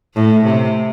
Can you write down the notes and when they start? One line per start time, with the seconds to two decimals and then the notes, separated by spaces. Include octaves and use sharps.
0.14 A2
0.45 C3